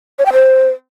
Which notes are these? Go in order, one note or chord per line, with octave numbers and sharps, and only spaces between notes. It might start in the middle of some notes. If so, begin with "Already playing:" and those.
C#5
G5
C5